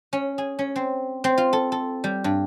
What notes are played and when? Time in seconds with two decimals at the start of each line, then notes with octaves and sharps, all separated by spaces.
0.13 C#4
0.38 G#4
0.59 C#4
0.76 C4
1.24 C4
1.38 F4
1.53 A4
1.72 A4
2.04 G3
2.24 G2